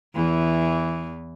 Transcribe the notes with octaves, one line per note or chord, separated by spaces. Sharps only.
E2 E3